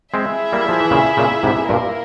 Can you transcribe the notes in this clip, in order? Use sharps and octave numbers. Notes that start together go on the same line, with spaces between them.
G#3 C4 E4 G#4 E5
G3 A#3
F3
E3
A#2 C#3
A#2 C#3
G#2 C3
G2 A#2 A#3 E4 A#4